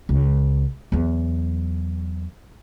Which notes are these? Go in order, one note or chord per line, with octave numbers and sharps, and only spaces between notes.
C#2
E2 F#3